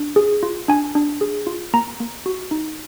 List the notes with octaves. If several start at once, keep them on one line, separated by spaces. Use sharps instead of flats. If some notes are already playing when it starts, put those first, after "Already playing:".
Already playing: D4
G#4
F4
D4 G#5
D4
G#4
F4
A#3 A#5
A#3
F#4
D#4